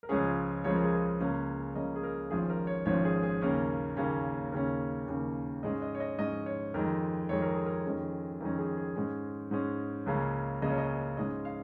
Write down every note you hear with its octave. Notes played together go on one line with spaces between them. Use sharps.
A#4
C#2 C#3 F3 G#3 C#4 G#4
C#2 C#3 F3 G#3 C#4 C#5
A#4
G#4
A#4
C#2 C#3 A#3 C#4
C#2 C#3 A#3 C#4 D#5
G#4
A#4
G#1 G#2 F3 C#4 G#4
A#4
C#5
G#1 G#2 F3 C#4 C#5
G#4
G#4
D#2 C#3 A#3 C#4 A#4
D#2 C#3 A#3 C#4
D#2 C#3 A#3 C#4 A#4
D#2 C#3 A#3 C#4
G#2 G#3 C#4 D#5
D#5
C#5
D#5
G#2 G#3 C#4 D#5
C#5
F2 D#3 G#3 A#4
F2 D#3 G#3 C#5
A#4
G#4
A#4
F2 D#3 G#3 C#4
F2 D#3 G#3 C#4 A#4
G#4
G#4
G#2 G#3 C#4
G#2 G#3 C#4
C#2 C#3 A#3 C#4
C#2 C#3 A#3 C#4 D#5
C#5
D#5
G#2 G#3 C#4 D#5
F5